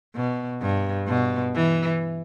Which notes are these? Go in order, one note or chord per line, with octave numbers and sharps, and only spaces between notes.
B2
G2
B2
E3